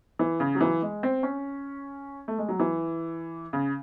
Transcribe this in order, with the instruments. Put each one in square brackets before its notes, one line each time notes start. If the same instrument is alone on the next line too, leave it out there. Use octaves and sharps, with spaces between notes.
[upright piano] E3
C#3
F#3
E3
G#3
C4
C#4
A3
G#3
F#3
E3
C#3